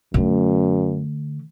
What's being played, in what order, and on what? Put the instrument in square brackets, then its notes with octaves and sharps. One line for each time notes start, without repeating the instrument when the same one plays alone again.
[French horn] F#2 [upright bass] D3 A3